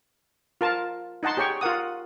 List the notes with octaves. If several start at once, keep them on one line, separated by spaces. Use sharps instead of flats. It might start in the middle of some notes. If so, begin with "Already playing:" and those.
F4 A#4 A5
D#4 D#5 F#5 A5 C6
G4 G#4 C#5 G5 C#6
F4 A#4 F#5 D#6